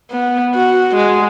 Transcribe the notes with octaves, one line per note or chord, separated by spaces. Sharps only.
B3
F#4
G#3